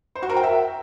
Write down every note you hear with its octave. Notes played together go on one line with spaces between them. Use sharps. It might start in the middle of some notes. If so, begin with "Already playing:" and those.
C5
F#4
A#4
G5
E5